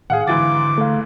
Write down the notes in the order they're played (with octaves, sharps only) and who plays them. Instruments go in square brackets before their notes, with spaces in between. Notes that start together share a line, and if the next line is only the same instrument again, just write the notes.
[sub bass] A2 [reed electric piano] D#3 F5 [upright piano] G#4 F#5
[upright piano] G#2 E3 A6 [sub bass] D3 [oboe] D6
[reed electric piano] A3 F5